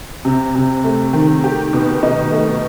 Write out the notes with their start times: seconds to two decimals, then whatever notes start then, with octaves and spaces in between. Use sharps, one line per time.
0.25 C3
0.55 C3
0.84 A3
1.13 D#3
1.44 G4
1.73 B2
2.03 D#4
2.32 A3